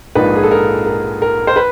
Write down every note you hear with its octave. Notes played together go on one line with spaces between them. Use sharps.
A#1 G#2 F3 A#3 D#4 B4
G#4
A4
A#4
A#4
A#4
C5
B4